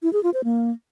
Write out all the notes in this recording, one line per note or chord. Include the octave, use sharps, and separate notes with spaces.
E4
G#4
F4
C5
A#3